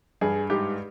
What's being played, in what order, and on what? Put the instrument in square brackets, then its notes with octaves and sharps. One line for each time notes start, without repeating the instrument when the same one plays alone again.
[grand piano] G2 G#4
G#2 G4